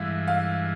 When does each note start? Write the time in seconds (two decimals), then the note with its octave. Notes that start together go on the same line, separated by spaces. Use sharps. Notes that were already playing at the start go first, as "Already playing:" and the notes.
Already playing: G2 E3 G#3 E5 F5
0.27 F5